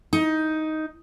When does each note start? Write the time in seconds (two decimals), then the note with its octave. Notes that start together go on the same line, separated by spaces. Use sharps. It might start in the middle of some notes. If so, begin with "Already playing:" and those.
0.13 D#4